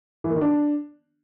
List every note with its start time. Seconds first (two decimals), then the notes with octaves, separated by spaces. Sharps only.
0.24 E3
0.30 A#3
0.36 D#3
0.41 D4